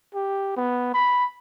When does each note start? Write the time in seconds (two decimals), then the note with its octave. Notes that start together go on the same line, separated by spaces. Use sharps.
0.15 G4
0.57 B3
0.94 B5